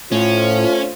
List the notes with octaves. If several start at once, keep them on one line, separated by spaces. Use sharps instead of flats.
A2 A3 C#4 F4 C5